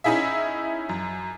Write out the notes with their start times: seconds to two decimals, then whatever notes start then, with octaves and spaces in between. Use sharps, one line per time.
0.04 C#4 D#4 E4 G#4 E5
0.89 F#2